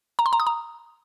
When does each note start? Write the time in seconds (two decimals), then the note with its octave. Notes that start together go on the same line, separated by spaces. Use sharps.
0.19 A#5
0.26 C6
0.33 A#5
0.40 D#6
0.47 A#5